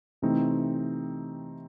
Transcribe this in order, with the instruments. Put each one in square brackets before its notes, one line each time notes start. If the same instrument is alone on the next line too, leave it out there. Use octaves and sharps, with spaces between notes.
[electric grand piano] C3 E3 A3 C4 D#4